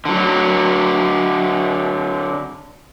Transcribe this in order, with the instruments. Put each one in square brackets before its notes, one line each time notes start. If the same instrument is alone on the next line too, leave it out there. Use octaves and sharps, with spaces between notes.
[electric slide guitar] D3 F#3